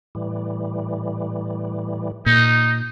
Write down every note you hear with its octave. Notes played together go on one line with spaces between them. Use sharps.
A2 E3 G3
A#2 D#4